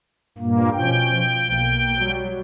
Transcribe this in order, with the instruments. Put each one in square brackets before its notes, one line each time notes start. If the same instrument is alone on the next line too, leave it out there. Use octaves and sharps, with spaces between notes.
[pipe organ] G2 A#2 A#3
[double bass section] B2 F3 C#4 [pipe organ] G5
[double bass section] F3
B1 A#3
F#3 G3